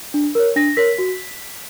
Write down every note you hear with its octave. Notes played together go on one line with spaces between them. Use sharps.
D4
A#4 C#5
D4 A#6
A#4 C#5 B6
F#4